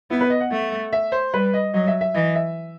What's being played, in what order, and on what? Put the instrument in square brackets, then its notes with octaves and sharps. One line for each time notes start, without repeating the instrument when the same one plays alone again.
[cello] B3 [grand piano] E4
[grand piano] B4
D#5
F#5
[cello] A3
[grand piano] E5
C5
[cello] G3 [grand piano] B4
[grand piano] D#5
[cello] F#3 [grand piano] D#5
[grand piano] E5
E5
[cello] E3 [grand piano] D#5
[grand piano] E5